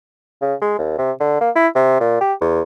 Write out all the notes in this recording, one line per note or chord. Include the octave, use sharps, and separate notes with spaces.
C#3
G#3
D#2
C3
D3
A#3
E4
C3
A#2
G4
E2